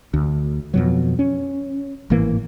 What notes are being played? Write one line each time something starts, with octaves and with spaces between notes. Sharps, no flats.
D2
F2 B2 F#3
C#4
G#1 A2 E3 A#3